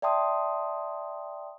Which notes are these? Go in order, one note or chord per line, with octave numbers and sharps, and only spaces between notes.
D5 E5 G5 A5 C6 D#6